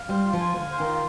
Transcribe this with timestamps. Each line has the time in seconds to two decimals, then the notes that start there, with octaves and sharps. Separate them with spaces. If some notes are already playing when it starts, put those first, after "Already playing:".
Already playing: F5
0.09 G3 C5
0.25 F4
0.33 F3
0.40 G#5
0.56 D3 F5
0.71 C5
0.80 D#3
0.87 F4